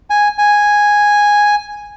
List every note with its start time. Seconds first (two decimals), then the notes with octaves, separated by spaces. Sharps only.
0.10 G#5
0.38 G#5